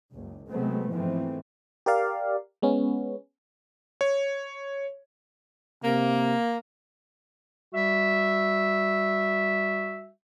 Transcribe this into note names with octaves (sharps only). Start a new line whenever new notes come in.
F#1 C#2
C3 F#3 G#3 A3 B3 C4
G#2 E3 F3 A3 C4
G4 A#4 D5 F5
G#3 B3 C#4
C#5
C3 A#3
G3 F#4 E5